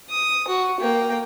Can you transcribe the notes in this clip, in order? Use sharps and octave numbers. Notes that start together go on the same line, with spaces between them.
D#6
F#4
A#3 G5